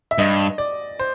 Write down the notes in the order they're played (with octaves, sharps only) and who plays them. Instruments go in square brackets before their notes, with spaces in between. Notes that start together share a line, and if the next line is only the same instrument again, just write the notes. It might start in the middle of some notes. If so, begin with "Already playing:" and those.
[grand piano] E5
[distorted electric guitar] G2 [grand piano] D#5
[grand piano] D5
C5